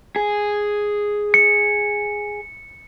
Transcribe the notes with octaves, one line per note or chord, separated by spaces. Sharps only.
G#4
C#7